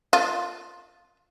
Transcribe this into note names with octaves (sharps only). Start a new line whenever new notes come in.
F4